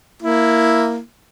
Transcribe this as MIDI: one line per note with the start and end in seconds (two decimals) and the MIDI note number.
0.22 0.99 58
0.22 0.99 64